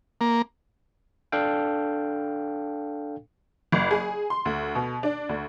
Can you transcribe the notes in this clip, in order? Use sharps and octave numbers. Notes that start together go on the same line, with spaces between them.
A#3
D4 A4 F5 G5
F#1
G#4
C6
D2
B2
D4
D2